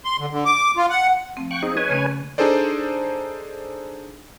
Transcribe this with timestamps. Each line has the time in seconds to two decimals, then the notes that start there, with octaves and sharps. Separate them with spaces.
0.05 C6
0.19 D3
0.31 D3
0.45 D6
0.77 F4
0.90 F#5
1.37 F3 A3 C4
1.51 F5 G5 C#6 F#6
1.63 C4 D#4 G#4
1.77 G#4 B4 C#5 D#5 G#5
1.89 C#3 A3 C#4
2.38 D4 D#4 G#4 A4 C5 D5